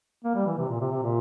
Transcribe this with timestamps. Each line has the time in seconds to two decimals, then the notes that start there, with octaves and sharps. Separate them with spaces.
0.24 A#3
0.35 G3
0.46 E3
0.58 C3
0.69 A#2
0.81 C3
0.91 C3
1.03 A#2